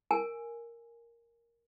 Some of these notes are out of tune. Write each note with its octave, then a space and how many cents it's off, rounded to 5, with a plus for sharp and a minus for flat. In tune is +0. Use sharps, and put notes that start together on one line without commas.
A#4 +0 G#5 +0